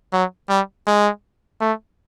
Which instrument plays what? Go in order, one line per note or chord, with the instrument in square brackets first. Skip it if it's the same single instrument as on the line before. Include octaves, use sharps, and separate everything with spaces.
[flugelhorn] F#3
G3
G#3
A3